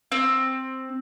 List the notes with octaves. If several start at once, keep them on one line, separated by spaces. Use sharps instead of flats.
C4